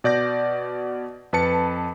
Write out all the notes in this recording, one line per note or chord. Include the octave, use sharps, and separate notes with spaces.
B2 D5 G6 A#6
F2 B4 A5 C#7